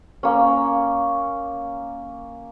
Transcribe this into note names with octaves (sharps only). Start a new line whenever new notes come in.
A#3 C#4